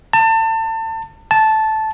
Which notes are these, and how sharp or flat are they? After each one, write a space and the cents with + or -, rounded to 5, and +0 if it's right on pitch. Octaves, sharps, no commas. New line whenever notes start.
A5 +30
A5 -10